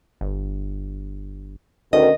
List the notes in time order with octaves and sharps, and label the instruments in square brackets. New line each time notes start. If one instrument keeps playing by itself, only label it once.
[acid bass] G1
[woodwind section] D2 B2 D#3 [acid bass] C#4 [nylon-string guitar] D#5